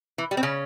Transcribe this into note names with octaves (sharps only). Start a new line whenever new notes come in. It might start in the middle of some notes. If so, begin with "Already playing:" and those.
E3
G3
C4
C#3 C#4